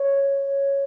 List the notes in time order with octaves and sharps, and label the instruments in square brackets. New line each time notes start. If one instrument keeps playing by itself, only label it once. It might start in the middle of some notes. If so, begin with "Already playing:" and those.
Already playing: [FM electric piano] C#5